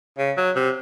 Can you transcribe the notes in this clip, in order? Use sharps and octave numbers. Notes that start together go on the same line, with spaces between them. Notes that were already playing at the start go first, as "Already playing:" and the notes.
C#3
F#3
C3